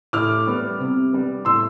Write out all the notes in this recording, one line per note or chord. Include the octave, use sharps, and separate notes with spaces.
A2 D6 F6
G3 B3
C3
G3 B3
A2 C6 E6